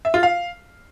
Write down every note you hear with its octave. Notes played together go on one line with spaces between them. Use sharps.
E5
F4
F5